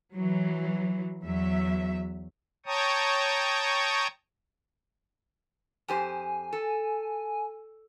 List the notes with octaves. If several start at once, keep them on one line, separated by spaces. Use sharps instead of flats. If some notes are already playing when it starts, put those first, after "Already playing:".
E3 F#3
E2 F#3 E5
C#5 G5 A5 A#5 C#6 D#6
F2 G4 C5 G#5
A4